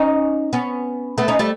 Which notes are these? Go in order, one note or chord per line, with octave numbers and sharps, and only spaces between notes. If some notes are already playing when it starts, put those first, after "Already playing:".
Already playing: C#4 D#4
B3 C#4
A3 B3
C#4 D#4
G3 A3